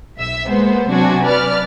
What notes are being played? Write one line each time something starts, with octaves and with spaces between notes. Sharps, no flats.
B1 E5 E6
G#3 A#3 B3 C5
C3 F#3 D4 F#4 G#5
B4 D5 F6